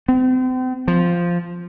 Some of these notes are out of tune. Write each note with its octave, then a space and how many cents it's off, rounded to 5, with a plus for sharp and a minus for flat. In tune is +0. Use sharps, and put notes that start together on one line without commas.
C4 -40
F3 -5